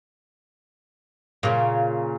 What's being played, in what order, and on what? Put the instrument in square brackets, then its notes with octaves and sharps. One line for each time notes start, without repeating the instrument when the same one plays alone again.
[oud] A#2 C#3